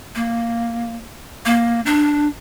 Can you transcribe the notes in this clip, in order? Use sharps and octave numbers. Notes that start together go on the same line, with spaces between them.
A#3
A#3
D4